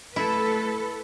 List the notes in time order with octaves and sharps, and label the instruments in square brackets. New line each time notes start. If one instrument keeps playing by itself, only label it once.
[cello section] A3 A4 B4 [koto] E4